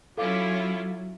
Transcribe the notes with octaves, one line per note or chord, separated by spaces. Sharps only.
F#3 C#4 E4 F4 A4 F5 D6